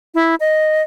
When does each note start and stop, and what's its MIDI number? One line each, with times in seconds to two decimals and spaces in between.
0.14 0.35 64
0.40 0.82 75